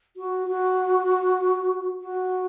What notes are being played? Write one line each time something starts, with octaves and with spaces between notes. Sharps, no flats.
F#4
F#4
F#4